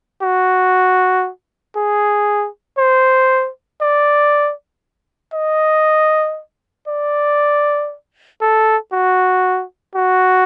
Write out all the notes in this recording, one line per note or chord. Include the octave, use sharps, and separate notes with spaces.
F#4
G#4
C5
D5
D#5
D5
A4
F#4
F#4